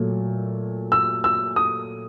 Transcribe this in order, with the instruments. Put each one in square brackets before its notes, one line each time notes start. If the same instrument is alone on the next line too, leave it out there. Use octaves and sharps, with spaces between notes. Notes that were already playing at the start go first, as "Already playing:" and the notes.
Already playing: [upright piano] A#2 F#3 A3
E6
E6
D#6